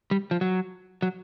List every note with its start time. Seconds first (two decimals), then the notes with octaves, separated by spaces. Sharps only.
0.11 G3
0.31 F3
0.41 F#3
1.02 F#3